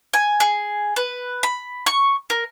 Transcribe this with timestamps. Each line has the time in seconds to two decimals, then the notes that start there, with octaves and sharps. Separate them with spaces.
0.14 G#5
0.40 G#4
0.96 B4
1.43 B5
1.86 C#6
2.30 A#4